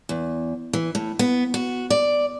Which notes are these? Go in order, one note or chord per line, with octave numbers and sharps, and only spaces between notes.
E2
E3
A2
B3
F#4
D5